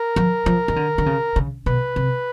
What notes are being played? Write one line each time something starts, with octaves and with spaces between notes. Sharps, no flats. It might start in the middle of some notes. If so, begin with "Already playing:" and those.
Already playing: A#4
F3
F3
D#3
D3
D3
C#3
C#3
B2 B4
C3